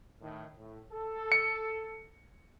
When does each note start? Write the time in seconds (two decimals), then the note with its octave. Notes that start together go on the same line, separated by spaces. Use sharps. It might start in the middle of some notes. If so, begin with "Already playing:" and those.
0.21 A2 D#3
0.58 A2
0.91 A4
1.32 C#7